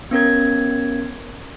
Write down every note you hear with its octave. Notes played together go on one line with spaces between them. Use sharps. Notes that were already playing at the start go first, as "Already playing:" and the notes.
B3 C#4 A#4 G#6